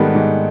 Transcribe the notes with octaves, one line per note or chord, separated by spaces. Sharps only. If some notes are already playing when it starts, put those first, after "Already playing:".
Already playing: G#2 D#3 G3 B3 A4
G#2